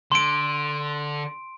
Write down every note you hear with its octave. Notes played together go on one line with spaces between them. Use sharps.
D3 C6 D7